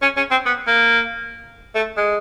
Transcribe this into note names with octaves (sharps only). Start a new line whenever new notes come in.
C#4
C#4
C4
B3
A#3
A3
G#3